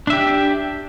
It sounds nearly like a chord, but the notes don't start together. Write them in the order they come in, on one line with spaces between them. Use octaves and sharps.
D4 E5 G4